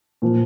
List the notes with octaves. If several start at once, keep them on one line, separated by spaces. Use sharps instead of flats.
A#2 F3